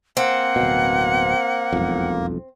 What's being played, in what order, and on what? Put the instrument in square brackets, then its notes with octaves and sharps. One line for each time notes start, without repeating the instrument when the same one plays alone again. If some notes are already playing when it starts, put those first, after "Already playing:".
[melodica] A#3 [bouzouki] C4 [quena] F#5
[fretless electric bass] D1 B2
E1 B1 F2